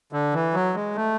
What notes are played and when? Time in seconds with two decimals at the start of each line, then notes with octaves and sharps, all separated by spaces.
0.13 D3
0.34 E3
0.54 F#3
0.75 G#3
0.95 A3